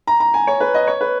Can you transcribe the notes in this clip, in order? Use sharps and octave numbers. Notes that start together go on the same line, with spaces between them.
A#5
A#5
G#5
C#5
B4
D#5
C#5
B4